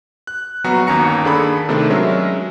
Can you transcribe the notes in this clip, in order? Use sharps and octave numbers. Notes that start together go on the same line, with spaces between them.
F#6
A#1 F#3 B3 F#4 A#5 C#6
G1 D#2 C#4 A#5 C#7
D#2 D4 G#4 A4 B5
C3 D#3 A3 C4 D4
F#3 G#3 C#4 A#4 E5